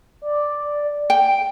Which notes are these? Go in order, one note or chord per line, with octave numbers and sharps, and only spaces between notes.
D5
G5 D7